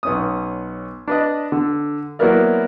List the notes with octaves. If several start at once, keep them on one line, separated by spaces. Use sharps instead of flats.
B1 C#4 D#6
D4 B4 D#5
D3
F#3 A#3 B3 E4 A#4 D5